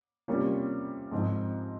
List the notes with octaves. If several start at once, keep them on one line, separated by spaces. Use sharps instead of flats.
C3 G3 A#3 C#4 F4
G#2 F3 G#3 C4 D#4